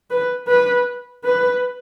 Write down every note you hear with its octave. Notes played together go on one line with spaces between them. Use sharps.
B4
B4
B4